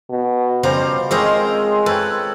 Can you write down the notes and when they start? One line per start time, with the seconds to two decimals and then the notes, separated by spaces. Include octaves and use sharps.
0.10 B2
0.63 C#3 F3 G3 C5 A#5
1.11 G#3 C4 C#4 G#4 A#4 C5 D#5
1.86 A4 B4 C#5 G5